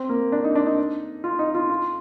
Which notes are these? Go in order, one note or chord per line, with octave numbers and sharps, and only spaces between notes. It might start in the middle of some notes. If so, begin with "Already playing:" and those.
Already playing: C4
A#3
D4
D#4
D4
D#4
F4
D#4
F4
F4